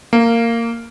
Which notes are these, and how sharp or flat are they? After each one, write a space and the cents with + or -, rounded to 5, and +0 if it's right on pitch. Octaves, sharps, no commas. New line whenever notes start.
A#3 -15